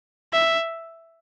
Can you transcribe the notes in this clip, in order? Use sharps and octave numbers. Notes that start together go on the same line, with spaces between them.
E5